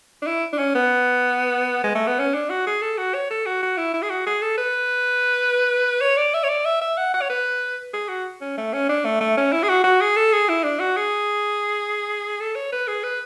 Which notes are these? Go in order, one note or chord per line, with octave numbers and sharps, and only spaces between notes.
D4
E4
D4
C#4
B3
G#3
A3
B3
C#4
D4
F#4
G#4
A4
F#4
C#5
A4
F#4
F#4
E4
E4
G#4
F#4
G#4
A4
B4
C#5
D5
E5
C#5
D5
E5
E5
F#5
F#5
C#5
B4
G#4
F#4
C#4
A3
C#4
D4
A3
A3
C#4
E4
G#4
F#4
F#4
G#4
A4
G#4
E4
D4
F#4
G#4
A4
C#5
B4
G#4
B4